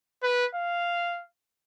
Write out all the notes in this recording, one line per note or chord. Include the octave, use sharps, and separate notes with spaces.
B4
F5